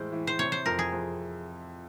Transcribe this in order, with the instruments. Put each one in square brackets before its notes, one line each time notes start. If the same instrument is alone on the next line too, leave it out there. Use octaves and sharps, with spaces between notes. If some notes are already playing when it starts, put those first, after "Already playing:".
Already playing: [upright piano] A2 E3 G#3 [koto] C5
[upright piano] E3
[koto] C5
[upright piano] C3 [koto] C#5
[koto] C5
[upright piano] F2 [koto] A#4
[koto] G#4
[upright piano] F2